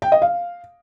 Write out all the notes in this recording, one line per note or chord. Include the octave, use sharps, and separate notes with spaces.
G5
D#5
F5